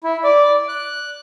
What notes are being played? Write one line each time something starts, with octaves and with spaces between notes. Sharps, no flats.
E4
D5
F#6